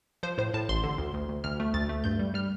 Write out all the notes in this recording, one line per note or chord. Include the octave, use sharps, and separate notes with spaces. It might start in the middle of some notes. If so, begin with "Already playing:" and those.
F3 C5
A2 C5
A2 A5
A1 C6
D3
D2
D2
D2
D2 F6
A3
D2 A6
A3
G2 G6
G3
G3 F6